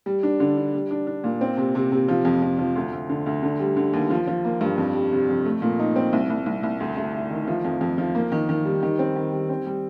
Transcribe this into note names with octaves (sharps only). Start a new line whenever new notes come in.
G3
D4
D3
D4
G3
D4
D4
A#2
C4
C3
C3
C3
F3
F2
F2
F3
D2
D2
D3
D2
D3
G3
D3
D#2
F3
F3
A#3
G2
F2
G3
C3
F2
A3
A#2
D#4
C4
C2
C2
C2
C2
D2
D2
D2
D#3
F3
F2
F2
F3
A#3
D#3
D#3
G3
D#3
C4
D#3
G3
C4
G3